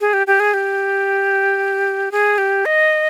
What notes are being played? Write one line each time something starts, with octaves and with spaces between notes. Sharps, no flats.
G#4
G4
G4
G#4
G4
G#4
G4
D#5